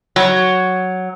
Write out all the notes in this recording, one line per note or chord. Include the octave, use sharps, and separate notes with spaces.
F#3